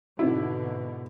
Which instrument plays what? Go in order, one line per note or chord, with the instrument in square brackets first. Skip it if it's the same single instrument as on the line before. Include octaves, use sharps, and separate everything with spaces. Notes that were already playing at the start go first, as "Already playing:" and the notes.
[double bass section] G#2 B2 D3 [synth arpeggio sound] C4 D#4 F#4 [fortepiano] E4